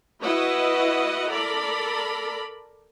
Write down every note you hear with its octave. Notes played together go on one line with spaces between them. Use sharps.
E4 F#4 B4 D#5 F#5
A4 A#4 D5 B5